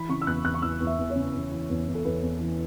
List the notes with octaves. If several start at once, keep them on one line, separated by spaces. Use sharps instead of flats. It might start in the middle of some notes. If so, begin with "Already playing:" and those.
Already playing: E3 B5
C#3 C#6
E6
E2 F#6
E2 F#6
C#6
E2 E6
E2
E5
E2
C#5
C#3
E2
E3
E2
E2
A4
E2 B4
E2
E3